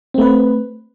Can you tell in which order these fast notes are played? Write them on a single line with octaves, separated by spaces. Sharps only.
C4 A3 B4